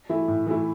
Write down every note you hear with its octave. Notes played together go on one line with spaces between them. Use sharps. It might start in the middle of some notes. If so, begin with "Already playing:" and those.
E3 A3 E4
A2
E3 A3 E4